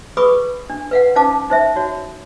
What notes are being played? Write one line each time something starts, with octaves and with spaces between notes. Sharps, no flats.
G#4 B4 B5 C#6 D#6
D4
B4 F5 F#5
C#4 D#4 C5 F5 A5 D6
D#4 C5 E5
D#4 F#4 C#5